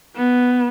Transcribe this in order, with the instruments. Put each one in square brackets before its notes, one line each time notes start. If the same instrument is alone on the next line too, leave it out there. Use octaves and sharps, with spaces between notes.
[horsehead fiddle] B3